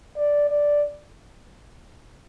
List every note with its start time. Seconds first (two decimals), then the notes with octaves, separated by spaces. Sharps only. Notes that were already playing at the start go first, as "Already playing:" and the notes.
0.17 D5
0.50 D5